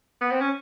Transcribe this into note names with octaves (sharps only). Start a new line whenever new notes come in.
B3
C4
C#4